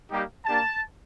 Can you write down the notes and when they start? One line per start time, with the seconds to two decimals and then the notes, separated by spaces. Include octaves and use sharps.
0.11 G3 A#3 D#4 G4
0.46 A#3 D4 G4 A5